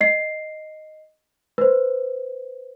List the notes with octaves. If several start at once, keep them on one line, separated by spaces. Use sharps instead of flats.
D#5 C7
B4 C5